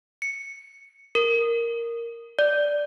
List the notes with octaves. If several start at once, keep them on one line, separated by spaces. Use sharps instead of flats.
C#7
A#4
D5